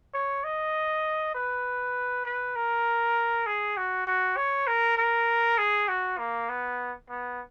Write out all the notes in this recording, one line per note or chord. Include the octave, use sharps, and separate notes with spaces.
C#5
D#5
B4
B4
A#4
G#4
F#4
F#4
C#5
A#4
A#4
G#4
F#4
A#3
B3
B3